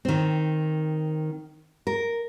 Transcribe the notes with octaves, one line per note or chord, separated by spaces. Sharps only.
D#3 C4
A#4